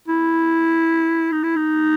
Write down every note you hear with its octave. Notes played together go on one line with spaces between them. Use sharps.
E4
D#4
E4
D#4